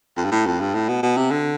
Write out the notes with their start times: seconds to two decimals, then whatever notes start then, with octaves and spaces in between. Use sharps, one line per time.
0.17 F2
0.25 G2
0.32 A2
0.46 F2
0.60 G2
0.74 A2
0.88 B2
1.03 B2
1.17 C3
1.31 D3